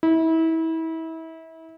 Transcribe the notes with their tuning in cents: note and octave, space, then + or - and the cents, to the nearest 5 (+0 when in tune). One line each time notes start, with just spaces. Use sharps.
E4 -30